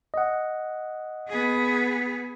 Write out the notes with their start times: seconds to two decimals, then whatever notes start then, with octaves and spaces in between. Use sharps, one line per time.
0.14 D#5 F#5
1.28 B3 G#4